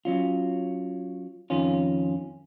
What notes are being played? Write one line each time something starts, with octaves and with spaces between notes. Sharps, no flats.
F#3 C#4 F4
F2 D#3 C#4 F4